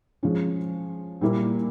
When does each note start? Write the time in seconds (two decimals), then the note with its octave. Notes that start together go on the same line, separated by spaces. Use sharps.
0.23 F3 G#3 C#4
1.21 A#2 G3 A#3 E4 A#4